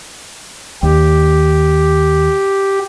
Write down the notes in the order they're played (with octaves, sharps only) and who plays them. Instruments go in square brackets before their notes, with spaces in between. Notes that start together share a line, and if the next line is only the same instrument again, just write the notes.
[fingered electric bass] D#2 [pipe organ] G4